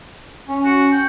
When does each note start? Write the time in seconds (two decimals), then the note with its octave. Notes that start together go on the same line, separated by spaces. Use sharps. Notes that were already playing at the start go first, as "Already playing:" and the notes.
0.48 C#4
0.65 F#4
0.93 G5